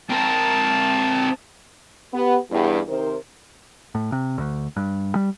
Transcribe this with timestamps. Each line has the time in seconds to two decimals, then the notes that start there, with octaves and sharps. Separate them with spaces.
0.10 C4 A#4 A5
2.14 B3 G4
2.51 E2 G2
2.88 C3 D#3 A#4 C5
3.95 A2
4.12 C3
4.38 D2
4.76 G2
5.15 G3